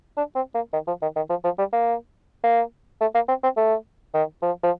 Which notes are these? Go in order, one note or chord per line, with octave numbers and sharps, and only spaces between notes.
D4
C4
A#3
D#3
F3
D#3
D#3
F3
F3
G3
A#3
A#3
A3
A#3
C4
C4
A3
D#3
F3
F3